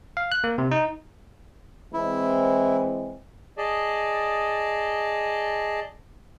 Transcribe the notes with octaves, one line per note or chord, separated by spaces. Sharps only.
F5
F#6
A#3
C3
D#4
E3 G#3 C4 E4
G#4 D5 D#5 A5